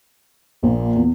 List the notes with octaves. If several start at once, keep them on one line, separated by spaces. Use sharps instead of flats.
A#1 A#2
E2